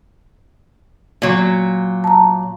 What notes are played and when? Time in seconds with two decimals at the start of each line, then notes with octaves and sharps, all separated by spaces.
1.22 A#2 F#3
2.04 A5 A#5